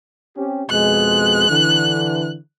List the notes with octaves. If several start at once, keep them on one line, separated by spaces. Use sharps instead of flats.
C4 C#4 G4
F2 B2 G#3 F#6
D3 E3